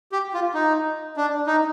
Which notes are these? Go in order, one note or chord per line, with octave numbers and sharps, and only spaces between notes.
G4
F4
D#4
D4
D#4